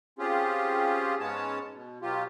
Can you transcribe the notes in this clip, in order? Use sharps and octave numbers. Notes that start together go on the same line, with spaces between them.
C4 C#4 F4 G4 G#4
G#2 G#3 B3 C#4 C#5 A5
B2
B2 F#3 F4 G4